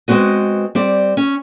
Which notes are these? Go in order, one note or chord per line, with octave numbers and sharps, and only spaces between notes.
G#3 B3 C4 F#4 D#5
G3 C4 D5
C#4